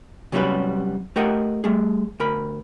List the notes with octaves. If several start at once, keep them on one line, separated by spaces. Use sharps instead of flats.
C3 F#3 G3 C#4 F#4 B4
A3 G4 A#4 D#5 F#5
G3 A3 G#4
D2 A#4 B5